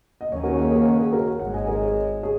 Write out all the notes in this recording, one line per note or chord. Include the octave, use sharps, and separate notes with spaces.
D#5
D#2 D#3 A#3 C#4 C#5
F#4 A#4
G#4 C#5
A#4 D#5
C#5 F#5
A#4
G#4 C#5
F#4 A#4
F#4
G#1 G#2 G#3 C#5 F#5
D#5 G#5
A#4 D#5
G#4 C#5
G#4 C#5